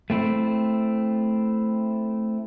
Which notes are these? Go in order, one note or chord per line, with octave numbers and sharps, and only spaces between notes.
A3 C4 E4